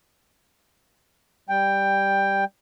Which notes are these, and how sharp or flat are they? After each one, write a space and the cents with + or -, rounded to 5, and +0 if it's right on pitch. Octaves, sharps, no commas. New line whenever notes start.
G3 +0 G5 +10